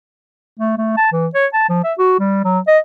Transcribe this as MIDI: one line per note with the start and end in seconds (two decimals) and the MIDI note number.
0.59 0.75 57
0.78 0.94 57
0.97 1.08 81
1.12 1.27 52
1.34 1.46 73
1.53 1.65 81
1.69 1.81 53
1.84 1.93 76
1.98 2.15 66
2.19 2.40 55
2.45 2.59 54
2.67 2.79 75